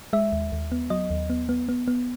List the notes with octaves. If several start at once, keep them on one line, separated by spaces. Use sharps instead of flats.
G#3 E5
D#2
D#2
B3
F#3 D#5
D#2
B3
B3
B3
B3